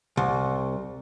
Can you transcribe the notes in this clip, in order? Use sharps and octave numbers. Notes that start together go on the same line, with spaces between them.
C2